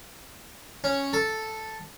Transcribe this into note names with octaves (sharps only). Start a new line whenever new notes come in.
C#4
A4